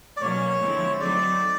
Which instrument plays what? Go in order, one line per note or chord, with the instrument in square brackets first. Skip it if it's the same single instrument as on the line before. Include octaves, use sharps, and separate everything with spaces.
[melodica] D5
[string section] B2 F#3 A#3 C#4 [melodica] C#5
[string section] D3 F3 G#3 C4 E4
[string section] F#3 A3 C4 D#4 [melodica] D5